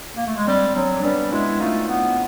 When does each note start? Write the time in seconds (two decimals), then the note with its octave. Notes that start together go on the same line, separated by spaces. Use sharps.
0.16 A#3
0.27 A3
0.37 G#3
0.47 G3 C4
0.75 F#3 C4
0.96 D4
1.04 G3 B3 C#4
1.32 G#3 E4 F#4
1.60 A3 D#4 F4
1.89 B3